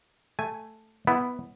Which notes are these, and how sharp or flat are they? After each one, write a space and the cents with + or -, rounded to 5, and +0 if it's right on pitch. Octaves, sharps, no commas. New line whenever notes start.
A3 +0 G#5 +0
B3 +0 E4 +0